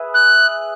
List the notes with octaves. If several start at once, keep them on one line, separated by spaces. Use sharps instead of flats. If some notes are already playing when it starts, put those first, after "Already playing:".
Already playing: G#4 B4 E5
F#6